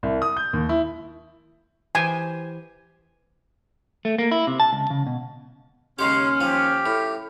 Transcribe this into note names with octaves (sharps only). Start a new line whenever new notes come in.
C2
D#6
G6
D#2
E4
E3 G4 C5 G#5
A3
A#3
E4
C3
A5
C#2
C#3
B2
D#2 C#3 G#3 C#4 G4 C6 F6
F3 G4
A2